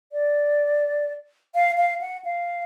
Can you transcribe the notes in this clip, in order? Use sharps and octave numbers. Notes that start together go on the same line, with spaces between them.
D5
F5
F5
F#5
F5